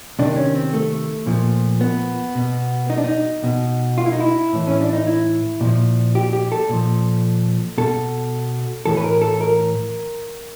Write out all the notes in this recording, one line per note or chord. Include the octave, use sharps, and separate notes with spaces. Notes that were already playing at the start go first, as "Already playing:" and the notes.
C3 D#3 D4
C#4
C4
A3
A#2 F3
B3
B2
D#4
D4
D#4
B2
F4
E4
D#4
E4
A2 E3
C#4
D4
D#4
E4
A#2 F3
G4
G4
A4
A#2 F3
B2 A4
A2 E3 A4
B4
A#4
A4
A#4